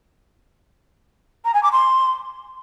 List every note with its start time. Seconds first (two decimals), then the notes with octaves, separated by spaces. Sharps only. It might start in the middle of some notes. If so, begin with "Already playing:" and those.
1.44 A#5
1.53 G#5
1.63 D6
1.72 C6